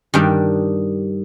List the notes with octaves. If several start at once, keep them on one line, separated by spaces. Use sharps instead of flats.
G2 D#3 G3 D4